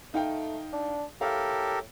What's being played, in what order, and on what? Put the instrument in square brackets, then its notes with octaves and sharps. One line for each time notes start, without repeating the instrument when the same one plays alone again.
[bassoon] A3 [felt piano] D#4 F5 G5
[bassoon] D4
[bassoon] A2 [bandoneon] G4 A4 A#4 [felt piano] F5